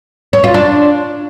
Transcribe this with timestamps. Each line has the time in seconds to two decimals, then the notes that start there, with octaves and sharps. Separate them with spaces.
0.33 C#5
0.44 F4
0.54 D4